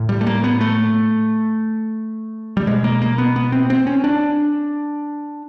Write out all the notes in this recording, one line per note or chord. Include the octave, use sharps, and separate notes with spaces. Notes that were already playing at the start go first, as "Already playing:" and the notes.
Already playing: A2
G3
A3
A#3
B3
A3
G3
B2 G#3
A#3
A#3
B3
B3
C4
C4
C#4
D4